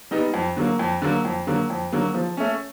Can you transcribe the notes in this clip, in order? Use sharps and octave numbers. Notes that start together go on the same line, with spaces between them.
G3 B3 D#4
F2
D3 F#3 A#3
F2
D3 F#3 A#3
F2
D3 F#3 A#3
F2
D3 F#3 A#3
F3
A3 C#4